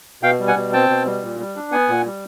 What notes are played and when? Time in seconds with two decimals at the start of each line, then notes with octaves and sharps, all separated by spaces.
0.23 B2 F5 G5
0.40 G3
0.48 F#5 G#5
0.56 B2
0.73 C4 G5 A5
0.90 B2
1.07 G3
1.23 A#2
1.40 G3
1.56 D4
1.72 B3 F#5 G#5
1.89 A#2
2.05 G3